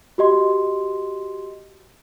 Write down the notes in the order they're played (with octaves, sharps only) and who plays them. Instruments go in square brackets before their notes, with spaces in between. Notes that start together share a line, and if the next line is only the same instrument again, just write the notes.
[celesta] F#4 G4 D#5 C6